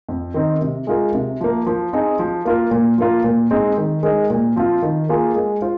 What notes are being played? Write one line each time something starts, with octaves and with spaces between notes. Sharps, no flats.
F2
D#3 C4 D#4
C3
G#3 F4 A#4
C3
F3 A#3
F3
C4 D#4 G#4
F3
A#3 F4 A#4
A#2
F3 A#3 F4
A#2
G#3 C4 D#4
D#3
G#3 D#4 A#4
A#2
F3 C4 F4
D#3
A#3 F4 G#4
G#3
F4 C5